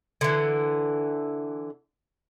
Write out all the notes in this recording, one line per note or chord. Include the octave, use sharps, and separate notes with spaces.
D3 E3